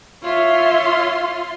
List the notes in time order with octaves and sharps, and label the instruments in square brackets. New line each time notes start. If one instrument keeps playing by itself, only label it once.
[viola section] F4 C6 [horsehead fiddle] C#5 E5